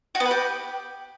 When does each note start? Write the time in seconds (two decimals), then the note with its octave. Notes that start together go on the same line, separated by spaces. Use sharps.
0.15 F#4
0.20 B3
0.25 B4
0.31 G4